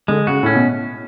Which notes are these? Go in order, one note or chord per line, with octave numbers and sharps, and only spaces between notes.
D3 G#3
C#3 F#4
A2 C#4
B2